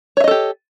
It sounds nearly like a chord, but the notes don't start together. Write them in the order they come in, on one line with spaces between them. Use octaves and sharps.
C#5 E5 D#5 A4 G4